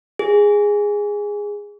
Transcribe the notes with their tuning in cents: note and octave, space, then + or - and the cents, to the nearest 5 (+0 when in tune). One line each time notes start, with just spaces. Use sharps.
G#4 -10